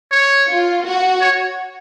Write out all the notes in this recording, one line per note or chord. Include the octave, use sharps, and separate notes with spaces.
C#5
F4
F#4
C#5